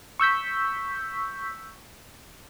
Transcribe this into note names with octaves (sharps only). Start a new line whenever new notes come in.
C#6 E6 G6 B6